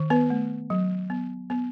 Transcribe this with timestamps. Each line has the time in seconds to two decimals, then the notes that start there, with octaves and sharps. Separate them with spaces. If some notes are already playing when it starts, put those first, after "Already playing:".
Already playing: D#3
0.10 B3 B4
0.30 A3
0.70 F#3
1.10 B3
1.50 B3